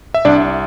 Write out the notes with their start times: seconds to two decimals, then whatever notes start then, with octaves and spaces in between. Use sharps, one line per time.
0.14 E5
0.25 C2 D4 D5